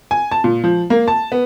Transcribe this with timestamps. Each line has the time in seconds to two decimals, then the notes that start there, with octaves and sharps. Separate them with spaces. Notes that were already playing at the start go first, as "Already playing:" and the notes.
0.11 G#5
0.32 A5
0.44 A#2
0.64 F3
0.90 A#3
1.08 A5
1.32 B3